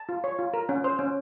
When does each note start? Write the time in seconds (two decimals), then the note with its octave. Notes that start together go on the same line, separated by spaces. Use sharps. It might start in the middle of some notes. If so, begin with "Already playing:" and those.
Already playing: A5
0.09 F4
0.24 C#5
0.39 F4
0.54 A#4
0.69 C#4
0.84 C5
0.99 C#4